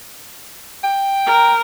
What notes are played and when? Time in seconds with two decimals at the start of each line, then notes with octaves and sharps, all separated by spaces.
0.83 G5
1.26 A#4